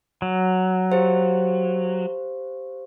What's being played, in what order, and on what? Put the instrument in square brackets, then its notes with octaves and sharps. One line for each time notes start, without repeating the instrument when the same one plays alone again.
[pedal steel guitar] F#3
[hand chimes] G4 C5 F5